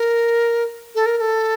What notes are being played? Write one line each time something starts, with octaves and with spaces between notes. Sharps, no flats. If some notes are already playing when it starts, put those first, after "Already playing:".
Already playing: A#4
A4
A#4
A#4
A4